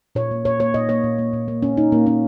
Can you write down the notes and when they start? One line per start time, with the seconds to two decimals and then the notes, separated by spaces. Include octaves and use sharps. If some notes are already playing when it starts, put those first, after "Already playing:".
0.15 A#2 C#5
0.31 A#3
0.45 A#2 C#5
0.60 A#3 C#5
0.74 A#2 D#5
0.89 A#3 C#5
1.04 A#2
1.18 A#3
1.33 A#2
1.48 A#3
1.62 A#2 C#4
1.77 A#3 D#4
1.92 A#2 A#3
2.07 A#3 C#4